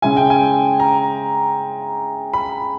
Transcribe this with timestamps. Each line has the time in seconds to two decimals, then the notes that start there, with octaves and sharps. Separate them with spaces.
0.02 C#3 G#3 C#4 E4 G#5
0.17 G5
0.30 G#5
0.80 A#5
2.33 B5